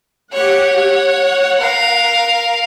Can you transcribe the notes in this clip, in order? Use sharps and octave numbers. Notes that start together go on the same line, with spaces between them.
G4 C#5 F#5
F#5
A#4 F5